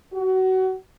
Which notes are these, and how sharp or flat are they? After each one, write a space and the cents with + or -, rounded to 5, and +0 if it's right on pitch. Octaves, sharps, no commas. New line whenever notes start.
F#4 +25